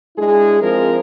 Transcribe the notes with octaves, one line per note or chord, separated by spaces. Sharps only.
G#3 D4 E4 G#4
F3 G#3 C4 A#4 C5